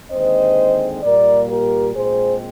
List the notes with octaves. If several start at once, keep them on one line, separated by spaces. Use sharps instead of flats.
D#2 D3 G#3 C4 C5 D#5
A#2 G3 A#3 A#4 D5
G4 A#4
A#2 G#3 C4 G#4 C5